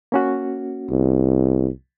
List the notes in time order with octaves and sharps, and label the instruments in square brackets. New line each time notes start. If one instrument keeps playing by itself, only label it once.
[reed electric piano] A#3 C#4 F#4
[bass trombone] C2